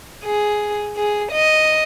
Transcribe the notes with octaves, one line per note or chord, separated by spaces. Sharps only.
G#4
G#4
D#5